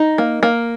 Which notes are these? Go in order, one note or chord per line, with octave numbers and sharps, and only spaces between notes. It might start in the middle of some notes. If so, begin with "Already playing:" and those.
Already playing: D#4
A#3
A#3